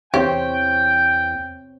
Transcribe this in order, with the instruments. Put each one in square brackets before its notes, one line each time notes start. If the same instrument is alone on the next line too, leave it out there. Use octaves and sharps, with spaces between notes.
[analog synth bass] E2 [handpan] C4 C5 C#5 [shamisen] G4 [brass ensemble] G5